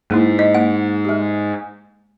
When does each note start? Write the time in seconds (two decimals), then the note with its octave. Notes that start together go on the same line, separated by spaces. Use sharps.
0.11 G#2 A#3 E4
0.39 D#5
0.54 A#3 F#5
1.05 G#3 G4